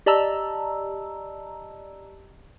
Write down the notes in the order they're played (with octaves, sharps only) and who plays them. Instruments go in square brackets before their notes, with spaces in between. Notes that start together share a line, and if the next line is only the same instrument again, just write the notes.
[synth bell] G4 D5 D#5 A5 A#5 E6